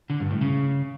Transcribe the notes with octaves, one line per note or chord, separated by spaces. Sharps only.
D3
G2
A2
C#3